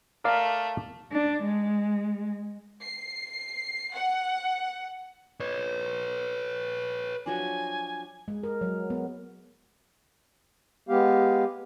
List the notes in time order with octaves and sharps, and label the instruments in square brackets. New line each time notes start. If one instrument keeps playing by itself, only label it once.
[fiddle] A3 [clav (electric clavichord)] A#4 D5 F5
[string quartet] D4
G#3
[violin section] C7
F#5
[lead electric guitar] B4 C#5
[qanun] F3 F#3 D4 [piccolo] G#5
[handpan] G#3
A#4
F#3
B3
[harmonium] G#3 B3 G4 F5